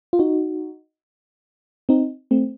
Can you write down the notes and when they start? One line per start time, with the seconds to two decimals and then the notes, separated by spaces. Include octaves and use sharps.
0.13 F4
0.19 D#4 F#4
1.89 C4 D#4
2.31 A3 C4